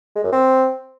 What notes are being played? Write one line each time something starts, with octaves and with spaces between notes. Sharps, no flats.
G#3
F#2
C4